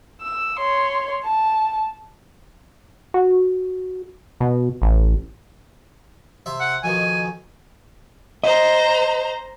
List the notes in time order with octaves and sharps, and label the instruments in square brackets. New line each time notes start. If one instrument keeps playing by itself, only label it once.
[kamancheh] E6
C#5 C6
A5
[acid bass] F#4
B2
A1
[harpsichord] C3 E5 C6
[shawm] F#5
[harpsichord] F2 B2 D#3 [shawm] G#5
[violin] C5 A#5 [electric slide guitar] D#5